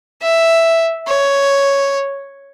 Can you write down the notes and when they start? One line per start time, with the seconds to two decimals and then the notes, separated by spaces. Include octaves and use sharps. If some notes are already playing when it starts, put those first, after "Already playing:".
0.23 E5
1.07 C#5